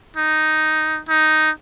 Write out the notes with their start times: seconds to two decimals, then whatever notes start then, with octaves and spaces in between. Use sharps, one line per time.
0.16 D#4
1.09 D#4